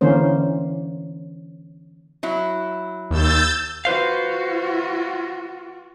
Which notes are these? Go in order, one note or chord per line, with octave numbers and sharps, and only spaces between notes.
D3 E3 A#3 C#4 C5
F#3 E4
D#2 E6 G6 A6
F4 F#4 B4 C5 F5